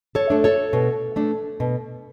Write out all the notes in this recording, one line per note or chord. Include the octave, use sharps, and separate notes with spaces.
A4 C#5
A3 D4
A4 C#5
B2
A3 D4
B2